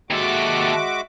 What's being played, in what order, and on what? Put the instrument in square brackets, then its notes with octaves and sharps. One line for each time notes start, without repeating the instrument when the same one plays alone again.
[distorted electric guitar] D#2 A4 [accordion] G#3 E5 [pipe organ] F#4 D6